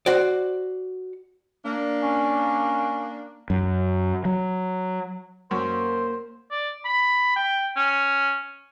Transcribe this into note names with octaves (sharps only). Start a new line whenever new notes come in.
F#4 C5 D5
A#3 D4
C#4
F#2
F#3
F#2 A#3 C5
D5
B5
G5
C#4